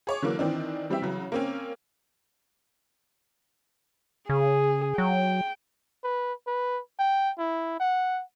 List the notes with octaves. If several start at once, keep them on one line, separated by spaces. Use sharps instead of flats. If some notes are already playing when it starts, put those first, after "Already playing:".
G#4 C#5 D6
D3 E3 F#3 A#3
D#3 E3 C4 D4
E3 G3 C4 G4 E5
C#3 E3 F#3
A#3 C4 C#4
C#3 G#4
F#3 G5
B4
B4
G5
E4
F#5